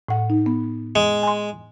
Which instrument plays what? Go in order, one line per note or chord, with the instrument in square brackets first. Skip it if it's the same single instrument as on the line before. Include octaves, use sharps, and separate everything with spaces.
[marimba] A2 F#5
D#4
B3
[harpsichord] G#3
[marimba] G#5 C6